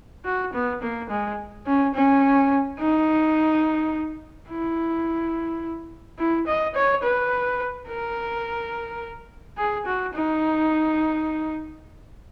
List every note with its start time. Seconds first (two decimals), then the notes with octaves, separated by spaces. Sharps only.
0.25 F#4
0.54 B3
0.82 A#3
1.10 G#3
1.67 C#4
1.94 C#4
2.80 D#4
4.50 E4
6.19 E4
6.47 D#5
6.75 C#5
7.03 B4
7.88 A#4
9.57 G#4
9.86 F#4
10.14 D#4